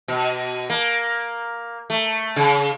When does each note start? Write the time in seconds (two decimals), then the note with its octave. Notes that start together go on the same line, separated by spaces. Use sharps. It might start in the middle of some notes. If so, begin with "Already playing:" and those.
0.08 B2
0.70 A#3
1.90 A3
2.36 C#3